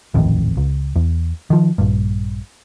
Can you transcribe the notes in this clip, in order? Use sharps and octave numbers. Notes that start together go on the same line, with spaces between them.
D#1 A1 F2 D#3
C#2
E2
D#3 F3
A#1 G2